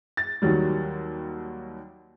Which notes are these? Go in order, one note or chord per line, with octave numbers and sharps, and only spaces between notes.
A6
D#2 D#3 F#3 G3